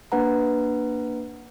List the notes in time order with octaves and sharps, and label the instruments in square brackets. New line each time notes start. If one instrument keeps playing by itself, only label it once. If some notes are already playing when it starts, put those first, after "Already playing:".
[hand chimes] A#3 D4 B4 F#5 A#5